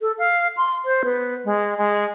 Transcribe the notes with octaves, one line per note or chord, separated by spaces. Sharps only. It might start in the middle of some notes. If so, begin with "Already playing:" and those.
A4
F5
C6
C5
B3
G#3
G#3